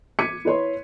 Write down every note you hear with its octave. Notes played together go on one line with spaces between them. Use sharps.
D6 G#6 B6 C#7 D#7
E4 B4 C#5 C6